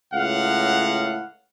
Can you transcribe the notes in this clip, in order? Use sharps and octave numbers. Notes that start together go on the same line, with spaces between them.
C#2 A2 F5 F#5